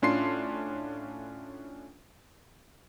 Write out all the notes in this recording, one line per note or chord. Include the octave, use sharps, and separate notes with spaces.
A2 C#4 D4 F4 C6 C7